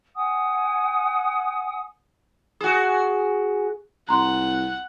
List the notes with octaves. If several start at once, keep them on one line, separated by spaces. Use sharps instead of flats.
F#5 G#5 D#6
F#4 G#4
C2 F#5 A#5 C6